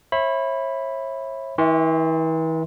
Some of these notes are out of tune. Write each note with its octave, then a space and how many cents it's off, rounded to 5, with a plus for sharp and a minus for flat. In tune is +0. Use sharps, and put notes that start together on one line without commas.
C#5 -40 E5 +0 B5 +0
E3 -40 E5 +0 C6 +0